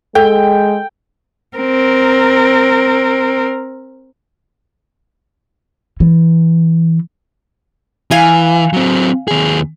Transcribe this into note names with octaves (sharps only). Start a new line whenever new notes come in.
G#3 A4 G5
C4 A#4
E3
E3 F5 G#5
F#3 C4
D#2 G#4